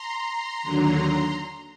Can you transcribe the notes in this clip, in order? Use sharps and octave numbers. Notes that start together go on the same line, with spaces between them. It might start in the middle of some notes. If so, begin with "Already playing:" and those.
Already playing: A#5 C6
D#2 D3 F#3